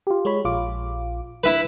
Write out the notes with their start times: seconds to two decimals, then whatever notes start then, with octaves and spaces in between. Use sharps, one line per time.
0.07 F4 G4
0.25 G#3 C#5 B5
0.45 A#1 F4 D6
1.44 E4 B4